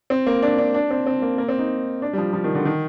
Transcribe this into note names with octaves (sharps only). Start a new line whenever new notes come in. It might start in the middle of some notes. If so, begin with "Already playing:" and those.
C4
A#3
D4
D4
D4
C4
C4
A#3
A#3
C4
D#4
D4
G3
F3
F3
D#3
D3
D#3